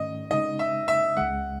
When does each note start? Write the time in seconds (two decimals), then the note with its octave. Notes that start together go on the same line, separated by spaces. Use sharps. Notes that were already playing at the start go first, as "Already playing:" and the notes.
Already playing: G#2 D#3 A3 C#4 D#5
0.31 C#3 G#3 D#4 D#5
0.59 E5
0.88 E5
1.17 C#2 C#3 G#3 F#5